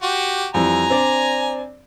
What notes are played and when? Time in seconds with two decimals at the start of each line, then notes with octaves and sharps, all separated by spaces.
0.03 F#4 G4
0.54 F2 E3 G3 G#5 A#5
0.90 C4 D4 D5